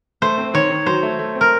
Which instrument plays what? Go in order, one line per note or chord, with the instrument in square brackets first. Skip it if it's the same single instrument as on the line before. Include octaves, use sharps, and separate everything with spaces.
[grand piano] A3 [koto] C5
[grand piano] C4
[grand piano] D#3 [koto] C#5
[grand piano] D#3
[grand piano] F#3 [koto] C5
[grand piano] A3
A3
C4
[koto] A#4